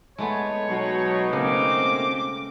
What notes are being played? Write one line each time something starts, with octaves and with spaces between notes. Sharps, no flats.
G#3 A3 B3 C#5
B2 F#3 D#4
C#3 A3 A#3 C4 D6